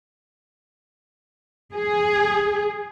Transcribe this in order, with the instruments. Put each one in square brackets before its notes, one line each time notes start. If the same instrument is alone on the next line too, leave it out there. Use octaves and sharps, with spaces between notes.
[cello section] G#4